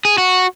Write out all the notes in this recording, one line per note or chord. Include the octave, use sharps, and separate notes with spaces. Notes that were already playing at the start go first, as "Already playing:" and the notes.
G#4
F#4